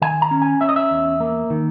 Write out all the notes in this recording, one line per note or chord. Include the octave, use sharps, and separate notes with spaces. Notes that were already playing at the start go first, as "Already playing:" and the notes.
D#3 G#5
A#5
C#4
G#5
C#4 E5
D#5
E5
E2
A#3
D#3